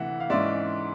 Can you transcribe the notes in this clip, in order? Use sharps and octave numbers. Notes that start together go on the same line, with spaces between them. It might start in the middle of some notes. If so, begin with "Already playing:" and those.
Already playing: D2 C3 E3 E5 F#5
F5
G#2 E3 G#3 C#4 D5 E5